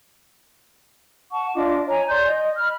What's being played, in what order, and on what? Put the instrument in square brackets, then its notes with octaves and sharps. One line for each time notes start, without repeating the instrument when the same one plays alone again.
[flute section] F#5 A5 C#6
D4 F4 D#5 D6
C#5 G#5 A#5
D5 C6 G6
D#5
B5 F6